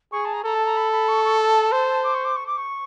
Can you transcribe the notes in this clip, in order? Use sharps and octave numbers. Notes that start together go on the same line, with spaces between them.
G#4 C#6
A5
A#5
A4 A#5
A5
A#5
B5
B5
C#6
C#6
A5
C5
D6
C#6
D6
C#6
D6
C#6